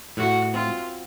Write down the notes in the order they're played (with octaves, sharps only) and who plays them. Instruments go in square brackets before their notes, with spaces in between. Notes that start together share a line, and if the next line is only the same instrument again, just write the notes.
[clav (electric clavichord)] A2 [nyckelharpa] F#4
[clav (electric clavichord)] C4 [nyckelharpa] F4